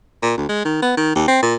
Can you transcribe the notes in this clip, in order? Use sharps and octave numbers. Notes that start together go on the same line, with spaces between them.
A#2
D2
G#3
D#3
B3
D#3
D#2
C4
A#2